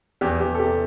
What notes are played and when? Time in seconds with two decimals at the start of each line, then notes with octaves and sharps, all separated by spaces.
0.21 E2 G4
0.40 E2 G4
0.55 A4
0.59 C3 G4